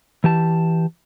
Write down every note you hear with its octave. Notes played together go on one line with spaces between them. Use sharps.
E3 G4 A5